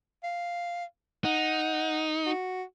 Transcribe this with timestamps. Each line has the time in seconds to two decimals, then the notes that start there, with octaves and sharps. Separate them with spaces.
0.24 F5
1.25 D#4 F#5
2.26 F#4